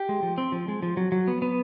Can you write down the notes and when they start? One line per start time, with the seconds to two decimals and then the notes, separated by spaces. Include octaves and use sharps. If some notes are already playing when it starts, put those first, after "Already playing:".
Already playing: G4
0.09 G#3
0.23 F3
0.38 C4
0.52 F3
0.68 G#3
0.83 F3
0.97 F#3
1.12 F#3
1.28 B3
1.42 B3